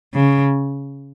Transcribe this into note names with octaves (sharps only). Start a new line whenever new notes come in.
C#3